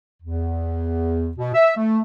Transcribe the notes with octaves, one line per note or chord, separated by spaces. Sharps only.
E2
B2
E5
A3